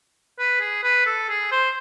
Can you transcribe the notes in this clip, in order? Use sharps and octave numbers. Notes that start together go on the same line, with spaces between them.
B4
G#4
B4
A4
G#4
C5